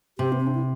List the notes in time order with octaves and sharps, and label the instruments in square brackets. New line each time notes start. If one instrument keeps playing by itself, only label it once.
[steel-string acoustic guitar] C3 [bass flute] G4
[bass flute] B3
C4
D4
E4